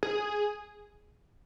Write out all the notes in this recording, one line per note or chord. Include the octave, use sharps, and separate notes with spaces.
G#4